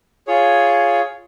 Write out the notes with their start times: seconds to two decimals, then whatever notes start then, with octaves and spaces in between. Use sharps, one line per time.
0.27 F4 G#4 C#5